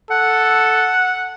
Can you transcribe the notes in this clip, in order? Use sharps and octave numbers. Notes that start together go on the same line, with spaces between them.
A4 F#5